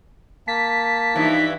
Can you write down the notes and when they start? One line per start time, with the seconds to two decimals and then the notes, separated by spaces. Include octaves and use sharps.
0.48 A#3 A5 B6
1.16 G2 E3 F3 D#4